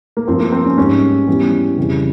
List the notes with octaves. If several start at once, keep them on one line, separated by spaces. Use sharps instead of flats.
A#3
G2 F3 C4
A#3
C4
C#4
G#2 G3 C#4
E2 E3 G3
F2 C#3 E3 G3